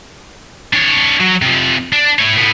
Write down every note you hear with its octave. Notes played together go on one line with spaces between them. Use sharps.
D4 C#5
F#3
C3 F3
D4
E4 C#5
A2 B3